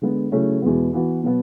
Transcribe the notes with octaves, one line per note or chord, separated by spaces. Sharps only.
D3 G#3 B3
C#3 F#3 A3 C#4 E4
E2 B2 G#3 B3
E3 B3 F#4
B2 F#3 B3